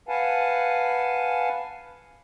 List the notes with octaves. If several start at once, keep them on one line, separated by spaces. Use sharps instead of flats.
B4 F5 F#5 G#5 A5